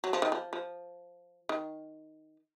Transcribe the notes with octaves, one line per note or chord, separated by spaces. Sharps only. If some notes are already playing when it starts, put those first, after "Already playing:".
F#3
F3
D#3
F3
F3
D#3